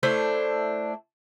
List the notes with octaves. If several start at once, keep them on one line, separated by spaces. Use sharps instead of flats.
A3 D4 E4 C5